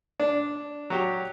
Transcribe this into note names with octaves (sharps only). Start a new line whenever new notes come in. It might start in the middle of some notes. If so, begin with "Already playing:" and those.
D4
F#3 G4